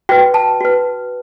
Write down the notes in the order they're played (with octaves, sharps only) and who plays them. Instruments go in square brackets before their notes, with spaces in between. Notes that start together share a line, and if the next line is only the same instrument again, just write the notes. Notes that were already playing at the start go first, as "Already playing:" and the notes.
[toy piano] F#4 B4 G5
A5
F#4 B4